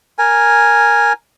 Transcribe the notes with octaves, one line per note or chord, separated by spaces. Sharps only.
A#4 G#5